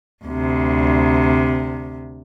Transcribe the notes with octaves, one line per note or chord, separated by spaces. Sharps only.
D2 C3